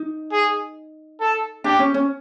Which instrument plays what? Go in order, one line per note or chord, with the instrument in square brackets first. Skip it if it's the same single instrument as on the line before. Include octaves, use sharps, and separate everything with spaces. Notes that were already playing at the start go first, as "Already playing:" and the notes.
Already playing: [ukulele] D#4
[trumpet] G#4
A4
[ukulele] D4 [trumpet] G4
[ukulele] C#4
C#4